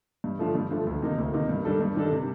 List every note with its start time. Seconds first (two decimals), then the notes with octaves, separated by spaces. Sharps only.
0.24 G2
0.39 D3 F3 A3
0.55 G2
0.71 D3 F3 A3
0.86 D2
1.02 C3 D#3 A#3 D#4
1.18 D2
1.34 C3 D#3 A#3 D#4
1.49 G2
1.65 D#3 G3 D4 A4
1.81 G2
1.96 D#3 G3 D4 A4
2.12 C3